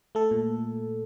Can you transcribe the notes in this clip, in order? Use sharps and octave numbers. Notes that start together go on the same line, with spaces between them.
A3 A4
A#2